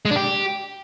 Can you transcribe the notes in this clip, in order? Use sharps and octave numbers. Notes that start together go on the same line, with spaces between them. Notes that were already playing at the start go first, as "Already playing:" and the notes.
G#3
D4
G4